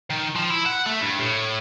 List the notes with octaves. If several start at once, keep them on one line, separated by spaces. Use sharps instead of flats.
D#3
F3
E4
F#5
A3
G2
A2